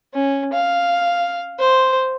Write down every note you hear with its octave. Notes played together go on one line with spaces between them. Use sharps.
C#4
F5
C5